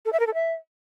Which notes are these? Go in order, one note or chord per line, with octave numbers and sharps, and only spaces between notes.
A4
E5
A#4
A4
E5